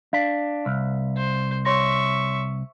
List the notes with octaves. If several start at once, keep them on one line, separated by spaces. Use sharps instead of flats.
D4 F5 B6
C2
C5
C#5 E5 C6 C#6 A#6